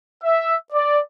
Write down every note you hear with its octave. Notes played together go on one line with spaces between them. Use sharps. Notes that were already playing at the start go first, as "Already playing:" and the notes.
E5
D5